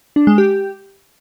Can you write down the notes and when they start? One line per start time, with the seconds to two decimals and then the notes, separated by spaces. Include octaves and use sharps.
0.16 D4
0.27 G#3
0.38 G4